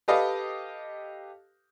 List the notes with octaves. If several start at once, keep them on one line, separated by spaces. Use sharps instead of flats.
G4 A4 B4 D#5 F5